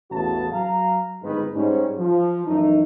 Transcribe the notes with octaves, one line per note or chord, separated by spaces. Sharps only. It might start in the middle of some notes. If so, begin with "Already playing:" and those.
A1 E2 C#3 F#4 A5
F#3 F5 A#5
G1 G#2 D#3 G#3 C4 B4
G#2 G3 C#4
F3
F#2 E3 A3 D#4